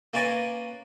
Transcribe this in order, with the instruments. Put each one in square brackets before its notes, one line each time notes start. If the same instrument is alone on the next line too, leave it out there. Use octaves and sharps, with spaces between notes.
[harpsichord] A#3 C#4 B4 D5 G#5 A#5